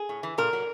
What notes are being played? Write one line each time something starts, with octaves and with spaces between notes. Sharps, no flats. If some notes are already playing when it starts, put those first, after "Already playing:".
Already playing: G#4
A2
E3
A#2 A#4
F#3